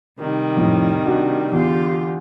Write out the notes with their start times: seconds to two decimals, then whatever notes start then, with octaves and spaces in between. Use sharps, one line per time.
0.19 C3 D#3 G3
0.57 F2 A2
1.06 D4 F#4
1.52 E2 D3 F4 G4